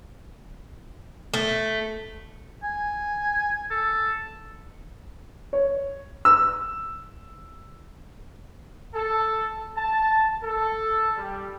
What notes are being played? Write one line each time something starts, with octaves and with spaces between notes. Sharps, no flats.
A3
G#5
A4
C#5
E6
A4
A5
A4
G3